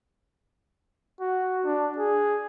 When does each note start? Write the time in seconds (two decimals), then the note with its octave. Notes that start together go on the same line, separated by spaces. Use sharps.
1.21 F#4
1.65 D4
1.98 G#4